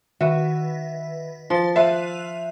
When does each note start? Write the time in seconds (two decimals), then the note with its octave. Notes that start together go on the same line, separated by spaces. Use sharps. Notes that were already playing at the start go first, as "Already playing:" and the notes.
0.21 D#3 F#4 B4 E5
1.50 F3 C6 A6
1.76 C5 E5 F5 F#6 D#7